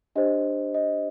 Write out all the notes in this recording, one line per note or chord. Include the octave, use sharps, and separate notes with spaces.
D4 G4 C5 D#5
D#5